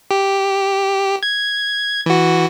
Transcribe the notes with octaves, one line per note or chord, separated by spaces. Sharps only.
G4
G#6
E3 F#4